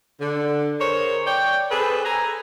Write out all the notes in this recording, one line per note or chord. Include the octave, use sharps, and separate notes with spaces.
D3
G#4 A#4 C5 C#5
C#5 D5 G5
C4 G#4 A4 B4
A4 G#5 A#5